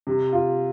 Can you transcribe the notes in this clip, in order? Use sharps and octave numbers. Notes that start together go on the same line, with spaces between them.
C3
F4